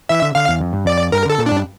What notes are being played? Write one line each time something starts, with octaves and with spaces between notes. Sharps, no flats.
E3 E5
D3
D3 F5
E2
F2
G2
F2 D5
G2 A#4
D3 A4
A#2
G2 D4